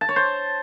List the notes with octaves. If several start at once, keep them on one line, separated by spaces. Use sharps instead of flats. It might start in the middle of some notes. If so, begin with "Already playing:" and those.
A5
C#5
C5